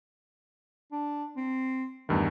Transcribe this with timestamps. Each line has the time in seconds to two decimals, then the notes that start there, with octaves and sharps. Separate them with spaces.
0.92 D4
1.36 C4
2.09 E2 G2 D#3 A3